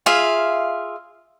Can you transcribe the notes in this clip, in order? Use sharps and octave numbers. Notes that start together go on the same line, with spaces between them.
F4 G#4 E5 F5